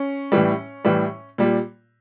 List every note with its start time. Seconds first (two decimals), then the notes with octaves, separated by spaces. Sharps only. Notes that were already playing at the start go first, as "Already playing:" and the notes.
Already playing: C#4
0.32 A2 E3 G3
0.85 A2 E3 G3
1.38 A#2 G3